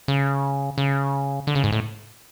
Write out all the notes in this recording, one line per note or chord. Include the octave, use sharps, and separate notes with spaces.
C#3
C#3
D3
C#3
G#2
A2